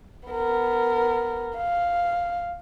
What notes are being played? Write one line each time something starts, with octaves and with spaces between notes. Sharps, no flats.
B3 A#4
F5